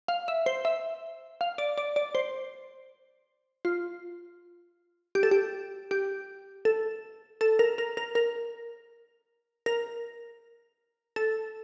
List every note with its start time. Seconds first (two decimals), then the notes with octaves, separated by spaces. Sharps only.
0.08 F5
0.28 E5
0.46 C5
0.65 E5
1.41 F5
1.58 D5
1.78 D5
1.96 D5
2.15 C5
3.65 F4
5.15 G4
5.23 A4
5.31 G4
5.91 G4
6.65 A4
7.41 A4
7.59 A#4
7.78 A#4
7.97 A#4
8.15 A#4
9.66 A#4
11.16 A4